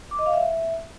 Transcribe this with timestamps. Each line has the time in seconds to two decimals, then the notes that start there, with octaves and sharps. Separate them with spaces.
0.11 D6
0.19 D#5
0.26 F5
0.34 E5